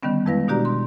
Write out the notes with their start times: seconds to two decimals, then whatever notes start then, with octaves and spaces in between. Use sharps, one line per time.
0.03 D3 D#3 G3 B3 C#4
0.26 F2 G#3 E4 B4 F5 A#6
0.48 B2 D4 F#4 G4 D5 A#5
0.65 C6